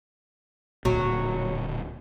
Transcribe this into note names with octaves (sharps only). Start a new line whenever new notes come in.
D1 G#1 A#2 F#3